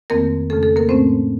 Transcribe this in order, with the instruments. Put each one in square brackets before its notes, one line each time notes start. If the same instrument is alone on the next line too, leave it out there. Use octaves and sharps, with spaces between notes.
[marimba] F2 D#3 A3 A#3 C4 A#4
F2 C#3 A3 C#4 A4
A4
A#3 A#4
A2 A3 C4 C#4 C5